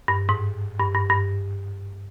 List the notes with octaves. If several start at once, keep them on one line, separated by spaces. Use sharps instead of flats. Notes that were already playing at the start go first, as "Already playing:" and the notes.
G2
G#2
G2
G2
G2